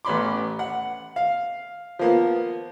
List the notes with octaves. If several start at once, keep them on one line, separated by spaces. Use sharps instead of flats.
A1 B3 C#4 B5 C6 D6
F#5
F5
F3 A#3 B3